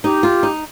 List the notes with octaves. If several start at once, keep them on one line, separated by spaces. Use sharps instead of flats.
D#4 G4
F4
D#4